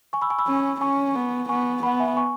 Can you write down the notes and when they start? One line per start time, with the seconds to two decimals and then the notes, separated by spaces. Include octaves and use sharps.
0.13 G#5 C#6
0.22 B5 E6
0.30 G#5 C#6
0.38 B5 E6
0.47 C#4
0.81 C#4 G#5 C#6
1.15 B3
1.49 B3 G#5 C#6
1.83 B3 F#5 B5
2.00 E5 G#5
2.17 G#5 C#6